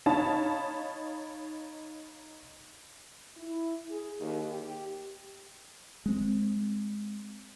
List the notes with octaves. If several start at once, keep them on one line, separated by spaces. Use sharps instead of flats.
D#4 C#5 F5 A5 B5
E4
G#4
D#2
G4
G#3 C4